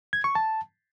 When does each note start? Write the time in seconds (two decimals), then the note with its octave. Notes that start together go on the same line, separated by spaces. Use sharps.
0.13 G#6
0.24 C#6
0.35 A5